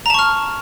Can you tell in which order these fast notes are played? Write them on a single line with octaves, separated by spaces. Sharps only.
A#5 A5 C#6 F6